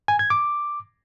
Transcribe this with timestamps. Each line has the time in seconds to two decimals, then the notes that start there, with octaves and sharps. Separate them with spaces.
0.08 G#5
0.19 G#6
0.30 D6